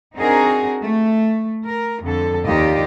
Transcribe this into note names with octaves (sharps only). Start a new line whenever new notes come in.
C4 D4 D#4 F#4 G#4 A#4
A3
A#4
F2 D3 A4
D#2 F4 G4 D5 D#5